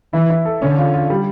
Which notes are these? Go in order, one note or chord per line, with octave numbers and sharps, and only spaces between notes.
E3 E4
E4
A4
D3 C#4
F4
F4
G3